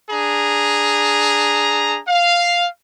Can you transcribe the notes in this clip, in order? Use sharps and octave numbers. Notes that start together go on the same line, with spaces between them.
D4 G#4 A#5
F5